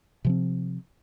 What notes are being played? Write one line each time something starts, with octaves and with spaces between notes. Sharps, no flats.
C3 F3 C4